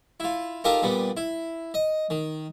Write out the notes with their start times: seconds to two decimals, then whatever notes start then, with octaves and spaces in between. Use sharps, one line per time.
0.20 E4 F4
0.64 D#4 F4 G4 A4 A#4 F5
0.83 A#2 G3 B3
1.17 E4
1.74 D#5
2.10 D#3